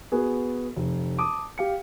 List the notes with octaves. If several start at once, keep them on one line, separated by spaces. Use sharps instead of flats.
B3 F#4 G#4
F1
A5 D6 D#6
G4 F5 C#7